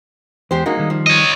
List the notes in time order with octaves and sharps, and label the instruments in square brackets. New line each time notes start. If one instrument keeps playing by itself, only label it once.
[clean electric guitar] E2 [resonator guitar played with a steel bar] G#3 G4 C5
[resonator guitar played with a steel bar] G#3 A#3 D#4 [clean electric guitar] F#4
[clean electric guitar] D#3 G3
[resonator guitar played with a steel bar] F3
[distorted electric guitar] C#5 D#5